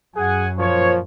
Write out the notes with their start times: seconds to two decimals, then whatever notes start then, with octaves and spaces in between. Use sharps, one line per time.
0.16 F#2 G#4 F#5 G#5
0.58 A#2 F3 C5 C#5